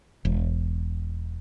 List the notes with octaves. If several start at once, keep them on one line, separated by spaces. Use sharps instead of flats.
E1